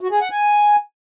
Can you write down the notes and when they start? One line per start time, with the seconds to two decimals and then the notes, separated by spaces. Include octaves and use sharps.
0.01 F#4
0.11 G#4
0.21 F#5
0.31 G#5